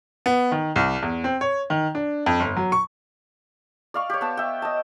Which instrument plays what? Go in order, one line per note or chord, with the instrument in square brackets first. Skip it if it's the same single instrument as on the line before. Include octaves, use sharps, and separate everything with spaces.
[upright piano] B3
D#3
C2
E2
C4
C#5
D#3
D4
F2
G1
F#3
C#6
[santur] D5 F5 C#6
G4 C#5
B3 A5
E5 G5
D#5 A5